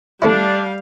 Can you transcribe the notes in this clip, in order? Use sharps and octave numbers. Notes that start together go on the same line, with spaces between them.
G3 A3 C#4 D4 E4 F5